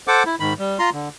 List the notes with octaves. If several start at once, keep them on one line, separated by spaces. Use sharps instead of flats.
A4 C5 F#5 D6
E4
G#2 D#3 B5
G3
F4 A#5 C6
D3